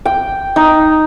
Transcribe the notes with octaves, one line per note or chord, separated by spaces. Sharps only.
G5
D#4